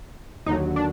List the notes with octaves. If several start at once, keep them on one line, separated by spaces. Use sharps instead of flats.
D#2 D3 F#3 D#4
D4